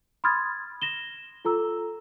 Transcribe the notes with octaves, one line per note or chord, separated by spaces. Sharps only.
B5 C6 D#6 F6 G#6 A6
A#6 E7 G7
F4 A4 A#5 E6